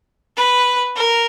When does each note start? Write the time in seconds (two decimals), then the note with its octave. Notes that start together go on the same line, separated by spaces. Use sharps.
0.37 B4
0.96 A#4